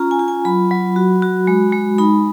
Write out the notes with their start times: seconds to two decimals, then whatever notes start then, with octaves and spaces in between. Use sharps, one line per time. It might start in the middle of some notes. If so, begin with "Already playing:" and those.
Already playing: C#4 F4 A#5
0.11 G#5
0.19 F4
0.28 G#5
0.45 F#3 B5
0.71 F#3
0.96 F#4
1.22 F#4
1.47 G#3
1.73 G#3
1.98 D#4 B5